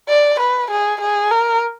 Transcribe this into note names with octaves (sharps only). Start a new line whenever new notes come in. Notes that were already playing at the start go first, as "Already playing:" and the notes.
D5
B4
G#4
G#4
A#4